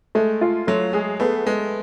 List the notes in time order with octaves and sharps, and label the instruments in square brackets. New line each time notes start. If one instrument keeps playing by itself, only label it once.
[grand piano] G#3 [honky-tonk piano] A3
[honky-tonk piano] F4
[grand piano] F#3 [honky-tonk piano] A3
[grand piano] G#3 [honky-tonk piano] G#4
[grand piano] A3 [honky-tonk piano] B3
[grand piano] G#3 [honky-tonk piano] B3